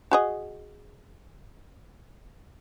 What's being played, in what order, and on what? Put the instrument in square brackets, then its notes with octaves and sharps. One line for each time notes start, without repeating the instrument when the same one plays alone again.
[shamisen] F#4 G#4 D#5